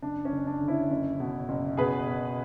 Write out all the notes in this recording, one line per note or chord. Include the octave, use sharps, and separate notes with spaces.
F#1 D4
C#4
F#1
D4
D3
C#4 E4
F#1
B2
F#1
B2 G#4 B4
B2